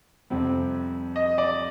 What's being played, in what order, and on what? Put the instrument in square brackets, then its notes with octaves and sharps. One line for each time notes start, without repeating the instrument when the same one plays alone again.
[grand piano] F2 C3 G3 C4
[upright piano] D#5
D5